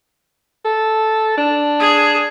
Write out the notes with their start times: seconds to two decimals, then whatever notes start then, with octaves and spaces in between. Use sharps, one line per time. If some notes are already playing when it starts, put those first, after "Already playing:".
0.65 A4
1.38 D4
1.80 G#4